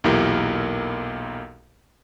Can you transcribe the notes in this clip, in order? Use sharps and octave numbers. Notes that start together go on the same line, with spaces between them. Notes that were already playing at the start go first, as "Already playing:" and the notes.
B1 E2 A#2 E4 G4 A#4